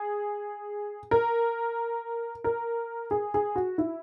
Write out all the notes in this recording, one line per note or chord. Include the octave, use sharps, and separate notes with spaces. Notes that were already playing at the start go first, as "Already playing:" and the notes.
Already playing: G#4
A#4
A#4
G#4
G#4
F#4
E4